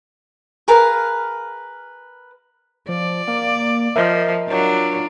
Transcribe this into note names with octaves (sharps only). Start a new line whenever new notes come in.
G#4 A#4 B4 F5
F3 D5
A#3
F3 A#4 D#5 E5
F#3 D4 F4